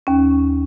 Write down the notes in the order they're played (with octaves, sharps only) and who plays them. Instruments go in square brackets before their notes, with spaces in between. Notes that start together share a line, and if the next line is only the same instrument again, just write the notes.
[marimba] D#2 C#4